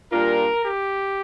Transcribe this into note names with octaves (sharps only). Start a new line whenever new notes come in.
A#2 G3 D4 F4 A#4
G4